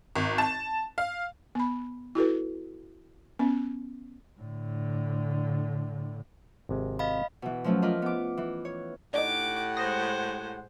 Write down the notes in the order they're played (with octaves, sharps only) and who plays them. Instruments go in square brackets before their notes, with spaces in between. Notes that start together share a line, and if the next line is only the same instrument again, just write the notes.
[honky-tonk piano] G#1
A5
F5
[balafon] B3 B5
E4 F#4 A4 B4
B3 C#4
[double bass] A2 D3
[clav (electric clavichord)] G#1 C3 G#3
[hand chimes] D#5 F5 B5
[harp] B2 E3
F3 F#3 A3 C#4
F4 A#4 D#5 B5 D6
B3 D6
E3
C#5
[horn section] A2 G4 F#5 [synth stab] D4 D#4 [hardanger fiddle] D6
[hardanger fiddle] G#3 C5 [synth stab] D#6 A#6